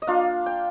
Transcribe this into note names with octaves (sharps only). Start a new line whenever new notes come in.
D#5
A#3 D4 F4 F5
G5